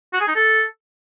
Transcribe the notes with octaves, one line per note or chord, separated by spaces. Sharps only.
F#4
G#4
D#4
A4